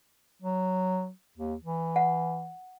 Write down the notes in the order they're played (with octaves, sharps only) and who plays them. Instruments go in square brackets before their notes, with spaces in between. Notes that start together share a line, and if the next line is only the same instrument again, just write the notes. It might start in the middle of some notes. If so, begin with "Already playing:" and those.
[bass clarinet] F#3
D#2
E3
[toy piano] F#5